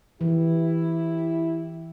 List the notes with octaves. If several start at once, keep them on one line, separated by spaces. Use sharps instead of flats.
E3 E4 G4